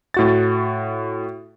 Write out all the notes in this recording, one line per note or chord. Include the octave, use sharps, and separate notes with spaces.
A2 F#4 A6